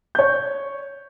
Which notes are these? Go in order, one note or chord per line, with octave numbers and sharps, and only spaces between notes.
C#5 G6